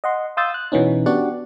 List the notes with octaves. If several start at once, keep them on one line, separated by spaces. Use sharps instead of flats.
D#5 F#5 C6
F5 C6 D#6 E6 G6 A6
F#6
B2 E3 B3 C#4 D#4
B3 D4 F#4 G4 D5 F#5